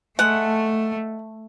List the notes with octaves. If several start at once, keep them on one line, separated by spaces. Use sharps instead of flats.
G#3 A3 F#5